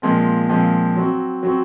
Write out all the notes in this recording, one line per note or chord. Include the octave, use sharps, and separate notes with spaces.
A#2 F3 G#3 C4
A#2 F3 G#3 C4
F#3 C4 F#4
F#3 C4 F#4